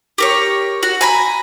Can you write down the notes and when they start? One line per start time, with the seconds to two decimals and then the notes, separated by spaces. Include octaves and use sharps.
0.18 G4 A#4 C#5
0.83 F#4
1.01 G#5 A#5 B5